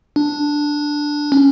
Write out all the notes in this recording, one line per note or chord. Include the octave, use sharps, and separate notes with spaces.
D4
C#4